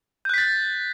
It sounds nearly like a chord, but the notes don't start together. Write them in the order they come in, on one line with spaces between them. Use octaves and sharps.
G6 F#6 B6 A6